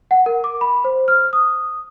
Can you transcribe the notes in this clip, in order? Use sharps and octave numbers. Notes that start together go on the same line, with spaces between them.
F#5
A#4
D6
B5
C5
F6
D#6